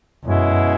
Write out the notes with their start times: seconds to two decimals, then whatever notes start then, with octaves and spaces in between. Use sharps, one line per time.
0.23 F#2 B2 G#3 C#4 E4